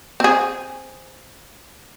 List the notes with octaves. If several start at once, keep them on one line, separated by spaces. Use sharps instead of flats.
C4 G#4